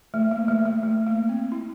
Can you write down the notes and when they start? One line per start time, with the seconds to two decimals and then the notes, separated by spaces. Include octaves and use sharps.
0.14 A3
0.31 A#3
0.48 A3
0.65 A3
0.83 A3
1.07 A#3
1.29 C4
1.52 E4